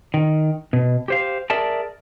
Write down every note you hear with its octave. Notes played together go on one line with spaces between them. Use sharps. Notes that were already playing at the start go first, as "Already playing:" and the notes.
D#3
B2
G4 C5 F5
G#4 A#4 D5 E5 A5